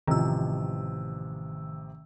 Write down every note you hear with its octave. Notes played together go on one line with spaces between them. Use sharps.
A1 C3 D#3 F3 E6